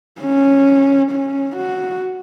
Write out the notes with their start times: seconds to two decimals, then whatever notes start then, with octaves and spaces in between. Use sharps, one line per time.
0.21 C#4
1.11 C#4
1.56 F#4